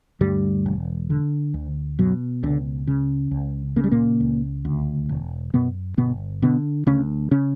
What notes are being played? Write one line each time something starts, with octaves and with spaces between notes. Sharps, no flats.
D2 G2 G3
E1
D3
D2
F#2 B2 F#3
C#2 D3
C#3
C#2
C#3 A#3
G3
A#2 A#3
C#2
D2
E1
F#2 B2 B3
G1 B2 B3
B2 D3 B3
D2 C#3 C#4
C#3 C#4